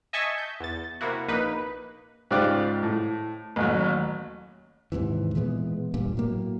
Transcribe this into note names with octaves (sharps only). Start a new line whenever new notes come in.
D#5 E5 G#5 A5 C#6 E6
G6
E2 A6
C3 A#3 E4 F#4
A#1 A#3 D#4 B4
G#2 C#3 F4 G4 D5 F#6
A2
A1 D#2 F#3
D#2 G#2 C3 E3
A#2 E3 G#3 B3
E1 G2 A#2
A2 F#3 A#3